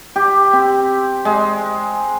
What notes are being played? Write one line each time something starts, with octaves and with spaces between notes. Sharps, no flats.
G4
C4
G#3